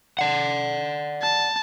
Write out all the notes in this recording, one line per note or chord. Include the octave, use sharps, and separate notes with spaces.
D5 F#5
A5